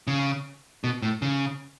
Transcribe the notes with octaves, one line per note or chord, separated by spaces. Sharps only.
C#3
B2
A2
C#3